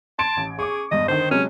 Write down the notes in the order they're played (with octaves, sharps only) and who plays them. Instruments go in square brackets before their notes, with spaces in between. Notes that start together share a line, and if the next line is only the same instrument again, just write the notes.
[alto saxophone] A5 [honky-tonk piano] C6 G#6 D7
[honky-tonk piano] A1
[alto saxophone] G#4 [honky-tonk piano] C#6 D6
[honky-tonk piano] E2 G2 [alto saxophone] D#5
[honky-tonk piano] D3 D#3 [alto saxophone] C5
[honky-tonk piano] C3 F#3 G#3 [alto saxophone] C#4